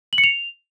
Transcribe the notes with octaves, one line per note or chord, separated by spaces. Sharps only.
F#7
C#7
F7